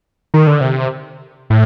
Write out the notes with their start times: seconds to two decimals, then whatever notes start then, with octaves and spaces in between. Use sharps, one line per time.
0.34 D#3
0.47 D3
0.61 C3
1.50 A2